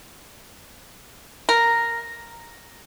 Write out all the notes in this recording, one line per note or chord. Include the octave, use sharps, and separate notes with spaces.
A#4